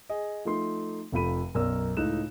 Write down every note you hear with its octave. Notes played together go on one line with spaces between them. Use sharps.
G#4 D#5
F3 A3 D#4 C6
F1 C3 F3 A4 B5 D#7
B1 F#2 B2 A#4 D5 E6
C#2 A2 D#4 A4 F#6 E7